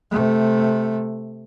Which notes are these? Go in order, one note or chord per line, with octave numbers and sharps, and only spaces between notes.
C3 A3